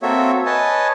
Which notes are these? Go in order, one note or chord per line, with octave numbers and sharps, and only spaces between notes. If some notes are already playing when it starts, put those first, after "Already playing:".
A#3 C4 F#4 A4 C#5 E5
B4 C#5 D#5 G#5 A5